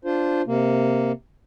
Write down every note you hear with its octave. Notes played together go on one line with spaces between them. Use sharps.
D4 F4 C5
C3 A#3